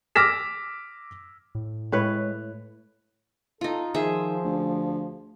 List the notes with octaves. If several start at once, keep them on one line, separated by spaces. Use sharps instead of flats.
D6 E6 F6 A#6 B6 E7
A2
A2 G#3 B4 C#5
D#4 F4 A4
D#3 F3 G#4 C5 E5
D2